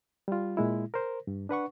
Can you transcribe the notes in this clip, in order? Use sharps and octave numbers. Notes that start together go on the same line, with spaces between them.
G3 F4
A#2 G#3 E4
A#4 C5
G2
D4 B4 F#5 C#6